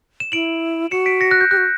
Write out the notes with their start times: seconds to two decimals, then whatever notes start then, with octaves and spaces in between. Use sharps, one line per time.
0.20 E7
0.32 E4 D7 F#7
0.91 F#4 C#7 E7
1.06 B6 D7
1.21 A#6 C#7
1.31 F#6 A#6
1.41 G6
1.51 G4 F#6
1.57 F#4